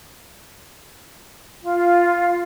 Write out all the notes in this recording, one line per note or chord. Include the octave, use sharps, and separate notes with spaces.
F4